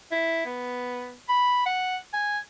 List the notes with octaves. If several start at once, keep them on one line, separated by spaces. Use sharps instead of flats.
E4
B3
B5
F#5
G#5